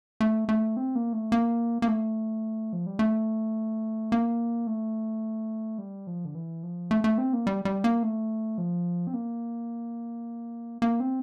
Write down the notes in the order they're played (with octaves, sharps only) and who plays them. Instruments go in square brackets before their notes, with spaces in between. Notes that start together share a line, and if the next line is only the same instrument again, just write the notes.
[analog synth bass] A3
A3
C4
A#3
A3
A#3
A#3
A3
F3
G3
A3
A#3
A3
G3
F3
D3
E3
F3
A3
A3
C4
A#3
G3
G3
A#3
A3
F3
C4
A#3
A#3
C4